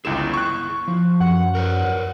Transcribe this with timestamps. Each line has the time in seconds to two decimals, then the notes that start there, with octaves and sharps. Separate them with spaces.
0.05 G1 C#2 E4 G#4 E7
0.34 C#6 F#6
0.88 F3
1.20 F#2 F#5
1.55 A#4 B4 C#5